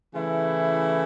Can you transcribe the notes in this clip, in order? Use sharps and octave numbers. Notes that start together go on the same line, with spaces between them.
C#3 E3 A3 E4